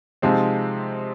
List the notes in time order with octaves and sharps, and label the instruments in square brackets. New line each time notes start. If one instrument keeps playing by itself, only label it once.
[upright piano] C3 F3 G#3 C4 D#4